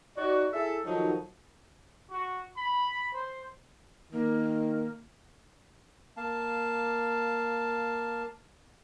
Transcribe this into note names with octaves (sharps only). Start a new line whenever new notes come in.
D#4 F#4 D5
E4 G#4 A4 E5
D#3 F3 F#3 D#4 F#4 A4
F#4
B5
C5
D#3 A#3
A#3 F5 A5